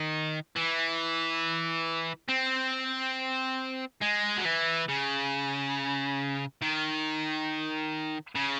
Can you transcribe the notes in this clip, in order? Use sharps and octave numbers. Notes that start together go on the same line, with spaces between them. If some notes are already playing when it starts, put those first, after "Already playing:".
Already playing: D#3
E3
C4
G#3
F#3
E3
C#3
D#3
C#3